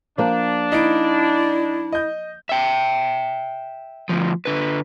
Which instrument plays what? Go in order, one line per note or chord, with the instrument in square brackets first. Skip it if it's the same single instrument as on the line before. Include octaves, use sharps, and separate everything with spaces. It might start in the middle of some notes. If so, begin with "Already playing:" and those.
[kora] F3 A#3 [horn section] D4
[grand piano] D#4 D7 [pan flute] E4
[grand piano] D#5 G6
[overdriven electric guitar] E5 G5
D2 F3
D3 B4